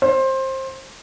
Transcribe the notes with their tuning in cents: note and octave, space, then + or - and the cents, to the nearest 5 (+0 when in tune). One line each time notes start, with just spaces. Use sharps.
C5 +20